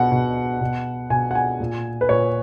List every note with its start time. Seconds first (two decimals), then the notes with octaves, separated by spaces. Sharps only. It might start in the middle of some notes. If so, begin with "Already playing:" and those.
Already playing: B2 F#5
0.12 B2
0.61 B2
1.10 B2 G#5
1.31 F#5
1.35 G#5
1.60 A#2
2.01 B4
2.09 A#2 C#5